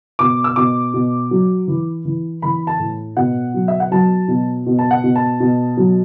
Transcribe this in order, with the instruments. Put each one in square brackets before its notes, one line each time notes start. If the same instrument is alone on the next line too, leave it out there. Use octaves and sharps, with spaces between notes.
[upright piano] B2 D6
E6
B2 D6
B2
F#3
E3
E3
E3 B5
A5
A2
B2 F#5
F#3
E5
F#5
F#3 A5
B2
B2
A5
F#5
B2
A5
B2
F#3